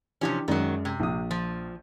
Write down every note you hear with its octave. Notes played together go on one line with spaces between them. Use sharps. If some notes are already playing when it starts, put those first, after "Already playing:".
C3 E3 F3 C#4 D4 G4
F#2 D#3 F#3 G#3 D5
C3
A#1 D#6
F3